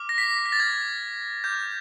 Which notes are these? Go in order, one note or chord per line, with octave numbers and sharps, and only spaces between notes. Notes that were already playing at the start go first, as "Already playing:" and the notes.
Already playing: D6 F6
A#6
B6
B6
A#6
A6
D6 F6 G#6
D6 F6 G6